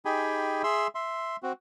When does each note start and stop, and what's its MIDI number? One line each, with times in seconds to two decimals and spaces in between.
0.05 0.62 63
0.05 0.62 67
0.05 0.62 68
0.05 0.62 79
0.05 0.62 80
0.05 0.62 83
0.64 0.87 68
0.64 0.87 76
0.64 0.87 84
0.64 0.87 88
0.95 1.36 76
0.95 1.36 84
1.43 1.52 60
1.43 1.52 66